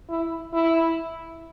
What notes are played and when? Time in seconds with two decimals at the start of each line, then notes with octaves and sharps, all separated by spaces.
0.09 E4
0.53 E4